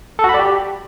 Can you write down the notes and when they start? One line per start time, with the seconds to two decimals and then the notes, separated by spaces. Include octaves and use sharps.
0.19 A4
0.24 F#4
0.29 B5
0.34 D5
0.39 G4